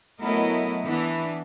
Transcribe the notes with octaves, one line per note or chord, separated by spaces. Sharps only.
F#3 A3 B3 E4 A#4 D#5
E3 B3 D4